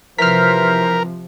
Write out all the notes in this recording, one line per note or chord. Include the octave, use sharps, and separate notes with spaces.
C3 E3 F3 A#4 C5 F6 B6